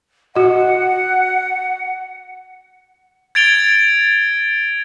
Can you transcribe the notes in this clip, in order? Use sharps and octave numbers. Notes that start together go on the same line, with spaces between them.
F#4 D#5 F#5
G#6 A6 D7 F7 G7